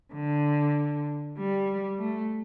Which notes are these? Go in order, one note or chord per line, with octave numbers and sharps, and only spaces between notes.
D3
G3
A3